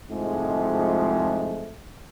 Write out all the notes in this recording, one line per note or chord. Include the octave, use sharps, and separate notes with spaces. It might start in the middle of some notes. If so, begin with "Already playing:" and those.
C2 F2 G#2 F3 G#3 A3